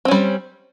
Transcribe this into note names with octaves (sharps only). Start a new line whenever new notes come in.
G3 C4 C#4